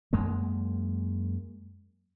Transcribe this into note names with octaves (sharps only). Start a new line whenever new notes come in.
F#2 G#3 A#3